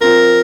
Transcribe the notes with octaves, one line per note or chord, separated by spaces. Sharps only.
F3 C4 F4 A#4